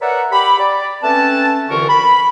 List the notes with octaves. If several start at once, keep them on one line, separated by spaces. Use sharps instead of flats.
A#4 B4 C#5 D5 E5 F#5
G4 B5
D5
A3 C4 C#4 B4 A5
C2 D3 E3 F4 A#4 C#6
B5